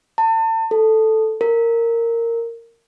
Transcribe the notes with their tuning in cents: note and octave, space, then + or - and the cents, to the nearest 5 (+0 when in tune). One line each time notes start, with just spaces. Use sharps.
A5 +35
A4 +0
A#4 -15